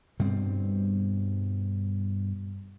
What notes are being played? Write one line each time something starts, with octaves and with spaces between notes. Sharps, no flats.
G2 B2 G3 C4